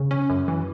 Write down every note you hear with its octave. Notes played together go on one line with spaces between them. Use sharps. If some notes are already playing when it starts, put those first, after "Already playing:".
Already playing: C#3
C#4
F#2
E3